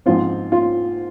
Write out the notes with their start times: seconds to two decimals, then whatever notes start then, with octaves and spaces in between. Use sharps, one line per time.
0.06 G#2 F3 C4 F4
0.52 F4